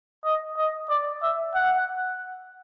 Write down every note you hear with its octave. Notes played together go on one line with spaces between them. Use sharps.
D#5
D#5
D5
E5
F#5